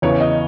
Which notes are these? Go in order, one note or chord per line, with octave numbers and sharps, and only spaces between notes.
E2 C#3 E3 C#5
D#5